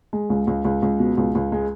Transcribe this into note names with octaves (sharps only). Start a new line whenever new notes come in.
G#3
C#2
C#2
C#2
C#2
B2
C#2
C#2
G#3